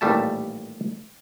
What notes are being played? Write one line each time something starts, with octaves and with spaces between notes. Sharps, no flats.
A1 D#2 A#2 G3 A3 A5